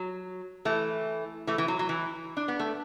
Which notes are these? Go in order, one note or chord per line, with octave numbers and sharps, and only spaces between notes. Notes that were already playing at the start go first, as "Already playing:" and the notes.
Already playing: F#3
E3 A3
E3 A3
E3
F#3
F#3
E3
D4
B3
A3